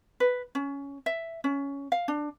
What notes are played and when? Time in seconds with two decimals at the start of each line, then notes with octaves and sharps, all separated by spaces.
0.20 B4
0.55 C#4
1.06 E5
1.44 C#4
1.92 F5
2.08 D4